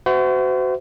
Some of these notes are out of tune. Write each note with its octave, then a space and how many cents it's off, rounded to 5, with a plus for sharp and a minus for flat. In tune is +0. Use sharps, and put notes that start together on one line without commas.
F#4 +15 C5 -40 E5 +0